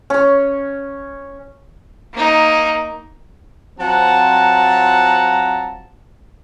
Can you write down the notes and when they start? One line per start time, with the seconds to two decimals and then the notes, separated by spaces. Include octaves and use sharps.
0.10 C#4 C#5
2.14 A#3 D#4
3.80 F#3 C4 F4 F#5 A5 A#5